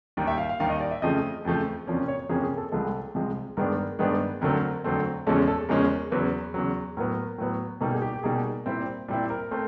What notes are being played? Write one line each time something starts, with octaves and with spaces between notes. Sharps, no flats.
D#2 D#3 G3
E5
F5
F5
D#2 D#3 G3 F5
D#5
D5
E5
F2 C#3 F3 A3 D#5
F2 C#3 F3 A3
F2 C3 F3 A#3 C#4 D5
C#5
F2 C3 F3 A#3 C#4 G#4
G#4
A4
C2 C3 F3 G#3 A4
C2 C3 F3 G#3
G2 D#3 G#3 B3 D4 A#4
G2 D#3 G#3 B3 D4
F2 D3 F#3 A3 C4 A#4
F2 D3 F#3 A3 C4
E2 C#3 F3 G#3 C#4 A4
A4
E2 C#3 F3 G#3 C#4 A#4
E2 C#3 F#3 B4
E2 C#3 F#3
A2 F#3 B3 A#4
A2 F#3 B3
B2 G3 A#3 D#4 A4
G#4
G4
G4
B2 G3 A#3 D#4 G#4
A#2 G3 C4 E4
A#2 G3 C4 E4
A#4
A3 C4